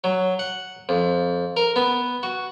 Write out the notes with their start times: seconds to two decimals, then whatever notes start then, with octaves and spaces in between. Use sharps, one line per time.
0.04 F#3
0.39 F#5
0.89 F2
1.57 A#4
1.76 B3
2.23 F#4